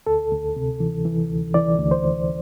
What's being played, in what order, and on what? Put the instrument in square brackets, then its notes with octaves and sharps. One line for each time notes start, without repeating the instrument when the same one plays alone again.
[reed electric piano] D2 A4
D2
C3
E3
E3
D2
E3 D5
D2
C5
D2